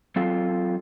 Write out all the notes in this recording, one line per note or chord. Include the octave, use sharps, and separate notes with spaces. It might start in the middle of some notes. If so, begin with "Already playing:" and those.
F#3 C4 F4 G#4 A4